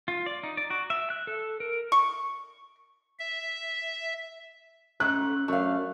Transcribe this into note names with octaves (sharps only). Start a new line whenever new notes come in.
F4
D5
D#4
D5
F#4
E5
F#6
A4
A#4
C#6
E5
G#2 A3 C#4 F#6
F#2 A3 D4 F5